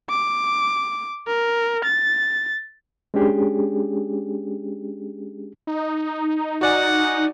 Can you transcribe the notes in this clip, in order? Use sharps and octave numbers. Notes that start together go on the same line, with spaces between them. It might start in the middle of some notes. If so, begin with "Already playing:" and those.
D6
A#4
A6
G#3 C#4 D4 G4 G#4
D#4
F#4 D5 F#5 G#5